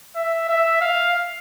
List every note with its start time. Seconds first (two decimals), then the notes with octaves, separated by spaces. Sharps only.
0.16 E5
0.49 E5
0.81 F5